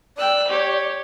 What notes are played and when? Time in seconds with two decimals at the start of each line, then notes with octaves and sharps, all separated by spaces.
0.18 D5 G5 E6 F#6
0.48 G4 C#5